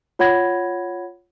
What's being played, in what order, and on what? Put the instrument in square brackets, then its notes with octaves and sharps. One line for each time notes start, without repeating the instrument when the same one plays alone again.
[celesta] F4 C#5 F#5 B5 G#6 A#6